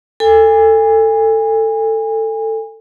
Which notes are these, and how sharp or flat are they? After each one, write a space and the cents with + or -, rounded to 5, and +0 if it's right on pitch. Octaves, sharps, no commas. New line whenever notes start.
A4 +15 G#5 -35